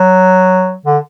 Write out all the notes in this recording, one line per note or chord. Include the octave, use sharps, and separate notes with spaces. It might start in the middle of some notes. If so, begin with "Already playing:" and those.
Already playing: F#3
D3